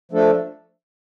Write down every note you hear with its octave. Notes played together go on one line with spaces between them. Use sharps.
F3 A3 D4 A4